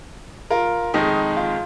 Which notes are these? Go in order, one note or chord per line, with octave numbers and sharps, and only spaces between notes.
F4 A#4
F2 D#3 G#3 D#4
F4